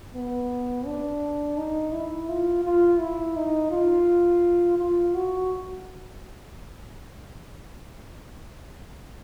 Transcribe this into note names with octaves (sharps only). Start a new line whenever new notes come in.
B3
D4
D#4
E4
F4
F4
E4
D#4
F4
F4
F#4